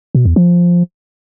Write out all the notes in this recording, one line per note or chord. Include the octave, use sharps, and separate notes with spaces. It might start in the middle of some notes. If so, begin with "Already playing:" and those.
B2
E2
F3